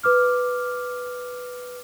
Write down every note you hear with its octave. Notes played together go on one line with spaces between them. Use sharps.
B4 D6 F6